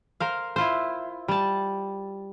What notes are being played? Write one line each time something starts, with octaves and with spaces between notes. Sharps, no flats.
A#4 C5 F5
E4 F4 C5
G3 A5